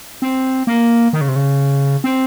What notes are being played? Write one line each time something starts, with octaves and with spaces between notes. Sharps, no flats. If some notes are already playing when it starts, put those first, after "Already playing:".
C4
A#3
D#3
C#3
C3
C#3
C4